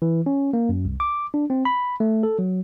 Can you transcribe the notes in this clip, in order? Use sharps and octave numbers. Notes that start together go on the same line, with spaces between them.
E3
C#4
A#3
F#2
C2
D6
D4
C4
B5
A3
A4
F#3